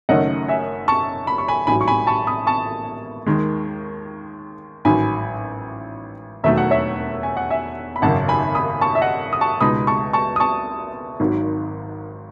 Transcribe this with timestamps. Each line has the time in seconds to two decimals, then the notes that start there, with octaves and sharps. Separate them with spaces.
0.09 F#1 F#2 D#3 A3 C#4 D#5 F#5
0.48 E5 G#5
0.88 A5 C#6
1.27 B5
1.38 C#6
1.48 G#5 B5
1.67 A1 G#2 F#3 G#5 B5
1.81 C#6
1.88 G#5 B5
2.07 A5 C#6
2.27 B5 D#6
2.47 A5 C#6
3.26 D#2 D#3 G#3
4.85 A1 G#2 D#3 F#3 G#5 B5
6.44 E1 D#2 D#3 F#3 A3 E5
6.58 F#5
6.71 C#5 E5
7.23 G#5
7.37 F#5
7.50 E5 G#5
7.96 B5
8.02 G#1 F#2 C#3 F#5 A5
8.28 G#5 B5
8.55 B5 D#6
8.81 A5 C#6
8.95 E5
9.02 D#5 F#5
9.33 D#6
9.41 A5 C#6
9.61 C#2 B2 G#3 D#4 B5 D#6
9.87 A5 C#6
10.13 A5 C#6
10.36 D#6
10.40 A5 C#6
11.20 G#1 G#2 D#3 F#3